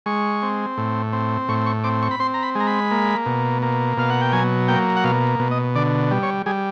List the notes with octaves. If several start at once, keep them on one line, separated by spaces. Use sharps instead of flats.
G#3 C#6
C4
A2
C4
A2 C#6
C#6
C4 D6
C#6
B5
C4 C6
A#5
B5
G#3
A#5
B5
A#3
B2
A#3
B2 F5
F#5
G5
F#3 G#5
A#3 G5
F#5
B2 F5
B2
D#5
D3 D5
G3
C#5
G3 G#4